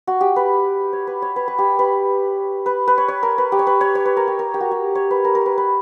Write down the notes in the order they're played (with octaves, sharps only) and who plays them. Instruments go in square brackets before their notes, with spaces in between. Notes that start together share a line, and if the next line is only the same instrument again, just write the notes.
[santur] F#4
G4
B4
C#5
B4
C#5
B4
B4
G4
B4
B4
B4
C#5
C#5
A#4
B4
G4
C#5
B4
C#5
C#5
B4
A#4
G4
A#4
G4
F#4
G4
C#5
B4
A#4
A#4
B4
B4